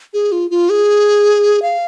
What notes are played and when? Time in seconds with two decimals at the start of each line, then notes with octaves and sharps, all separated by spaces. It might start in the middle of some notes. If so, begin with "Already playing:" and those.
0.14 G#4
0.32 F4
0.51 F4
0.70 G#4
1.62 F5